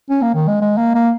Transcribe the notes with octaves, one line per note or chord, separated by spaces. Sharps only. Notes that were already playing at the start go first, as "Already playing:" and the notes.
C#4
A#3
D#3
G#3
G#3
A#3
A#3